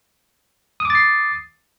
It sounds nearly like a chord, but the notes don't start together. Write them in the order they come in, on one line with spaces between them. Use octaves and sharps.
D#6 D6 A6 C7